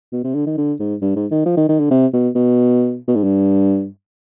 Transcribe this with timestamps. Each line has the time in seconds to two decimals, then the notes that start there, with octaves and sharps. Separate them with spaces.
0.13 B2
0.24 C3
0.35 D3
0.46 D#3
0.58 D3
0.79 G#2
1.02 G2
1.16 G#2
1.31 D#3
1.46 F3
1.57 D#3
1.69 D#3
1.80 D3
1.91 C3
2.13 B2
2.35 B2
3.08 B2
3.16 G#2
3.24 G2